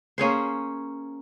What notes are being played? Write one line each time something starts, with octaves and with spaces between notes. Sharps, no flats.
A#3 C#4 G#4 C5